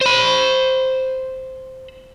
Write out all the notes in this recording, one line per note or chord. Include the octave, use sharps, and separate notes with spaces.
C5 B5